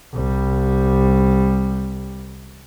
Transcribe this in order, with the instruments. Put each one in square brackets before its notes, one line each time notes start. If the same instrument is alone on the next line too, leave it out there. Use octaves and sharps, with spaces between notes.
[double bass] C2 G3